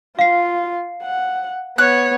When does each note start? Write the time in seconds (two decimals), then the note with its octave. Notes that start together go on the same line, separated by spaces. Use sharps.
0.19 F4 F5 C7
1.03 F#5
1.78 B3 C#5 F#6